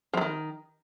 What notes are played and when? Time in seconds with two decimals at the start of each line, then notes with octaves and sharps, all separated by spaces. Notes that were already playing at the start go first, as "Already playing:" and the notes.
0.14 F3
0.17 F#3
0.21 D#3